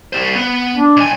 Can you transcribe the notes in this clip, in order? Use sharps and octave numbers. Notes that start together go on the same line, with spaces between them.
G3 C5
B3
D4
B1 G#5